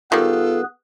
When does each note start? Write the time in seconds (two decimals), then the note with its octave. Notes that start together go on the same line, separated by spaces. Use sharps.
0.12 D#3 G3 B3 F4 G#4 A4 B4